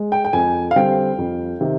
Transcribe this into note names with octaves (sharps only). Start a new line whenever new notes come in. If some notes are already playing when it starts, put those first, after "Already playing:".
Already playing: G#3
G5
G5
F2 G#5
F5
D3 G3 C4 G5
F2
C3 D#3